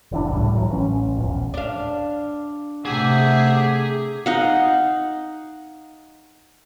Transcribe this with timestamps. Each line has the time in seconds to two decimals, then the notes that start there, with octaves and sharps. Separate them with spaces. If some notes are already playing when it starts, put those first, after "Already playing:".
0.12 F1 E3 D4
0.31 C#2 A2 G3
0.55 E3 F#3
0.71 A1 C#4
1.17 D#1 A#1 E2
1.54 D4 F5
2.85 C3 A3 G4 G#4 E5 F#5 G#5
4.26 D#4 F5 F#5